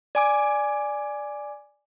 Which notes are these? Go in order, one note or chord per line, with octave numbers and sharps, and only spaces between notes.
D5 G#5 D6